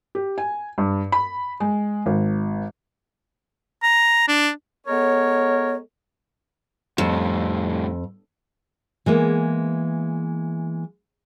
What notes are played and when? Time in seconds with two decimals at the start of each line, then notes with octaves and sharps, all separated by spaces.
0.15 G4
0.38 G#5
0.78 G2
1.12 B5
1.60 G#3
2.06 G#1
3.83 A#5
4.28 D4
4.87 G#3 B3 A4 A#4 C#5
6.98 F2 A2 G3
9.06 E3 G#3 A#3 B3